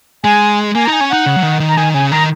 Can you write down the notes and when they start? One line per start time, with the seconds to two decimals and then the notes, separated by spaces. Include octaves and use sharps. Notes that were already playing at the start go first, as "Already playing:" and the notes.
0.24 G#3 G#5
0.75 A#3 G#5
0.85 D#4 A#5
0.93 G#5
1.01 C#4
1.10 D#4 F#5
1.26 C#3
1.36 F#3
1.43 D#3
1.60 D#3
1.69 A#5
1.77 D#3 G#5
1.94 C#3 G#5
2.11 D#3 A#5